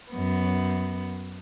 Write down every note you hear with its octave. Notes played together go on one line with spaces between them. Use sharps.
F#2 B3